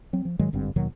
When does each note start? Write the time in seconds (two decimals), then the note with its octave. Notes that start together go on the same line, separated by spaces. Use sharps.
0.13 F#3 C4
0.25 F3
0.39 G#2 D#3 F#3 G#3
0.53 G#1 G2 D3 C4
0.76 D#2 B2 D#3 F#3